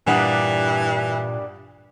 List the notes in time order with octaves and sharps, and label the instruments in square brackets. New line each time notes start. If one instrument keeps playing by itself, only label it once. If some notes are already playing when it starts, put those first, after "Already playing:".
[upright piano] G2 F#5 D#6 [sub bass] A#2 [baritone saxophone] E3 [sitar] G3 A#3 D4